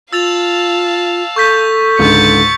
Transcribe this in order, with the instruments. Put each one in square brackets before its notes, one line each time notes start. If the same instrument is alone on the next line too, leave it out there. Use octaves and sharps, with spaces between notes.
[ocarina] F4 [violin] F5 A5 [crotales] E6 A6 F7
[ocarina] A4 [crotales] C#6 G6 B6
[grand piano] C#2 G#2 D3 [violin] A6 C#7